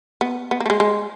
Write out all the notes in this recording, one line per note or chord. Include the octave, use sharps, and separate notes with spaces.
B3
B3
A#3
A3
G#3
G#3